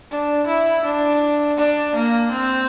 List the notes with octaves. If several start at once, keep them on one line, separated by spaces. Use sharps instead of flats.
D4
E4
D4
D4
A#3
C4